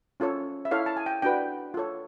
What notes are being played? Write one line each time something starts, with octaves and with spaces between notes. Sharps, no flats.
C#4 F4 A4 C#5
E5
E4 A4 C#5 F5
A5
G#5
G5
D4 F#4 B4 G5
F4 A4 C#5